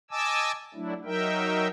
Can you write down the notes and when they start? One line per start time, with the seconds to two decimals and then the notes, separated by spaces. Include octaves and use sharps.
0.11 D#5 G#5 A5 D6 E6
0.75 F#3 A3 D4 E4
1.05 F#3 D#4 A#4 E5 G5